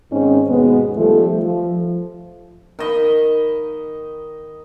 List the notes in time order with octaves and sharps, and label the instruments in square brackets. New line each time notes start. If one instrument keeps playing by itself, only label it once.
[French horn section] G#2 D#3 C4 C#4 D#4
D#2 G#2 B2 G#3 B3
D#3 F3 G3 A3
F3
[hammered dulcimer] D#3 D#5 B5